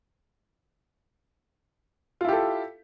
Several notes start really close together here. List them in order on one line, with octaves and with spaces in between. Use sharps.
F4 E4 G4 A4